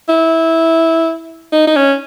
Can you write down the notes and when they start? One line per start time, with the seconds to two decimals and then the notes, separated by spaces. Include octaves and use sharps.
0.09 E4
1.53 D#4
1.67 D#4
1.76 C#4